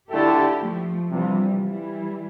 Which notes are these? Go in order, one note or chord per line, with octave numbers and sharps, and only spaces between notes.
D3 A3 D4 E4 F4 G4 A4
F3 A3
C3 E3 F3 G3 B3 D4 F4
E3 G3